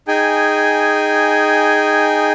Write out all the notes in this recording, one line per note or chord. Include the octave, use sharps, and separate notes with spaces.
D#4 G#4 G5 G#5